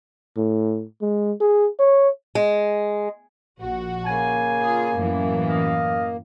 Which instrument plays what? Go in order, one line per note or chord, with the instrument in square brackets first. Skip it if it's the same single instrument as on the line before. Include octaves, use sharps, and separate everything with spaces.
[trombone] A2
G#3
G#4
C#5
[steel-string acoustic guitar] G#3
[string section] A#1 F#4
[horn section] C#3 G#5 [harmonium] A#3
[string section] F4 G#4
F#2 A2 E3
[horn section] D#5 F5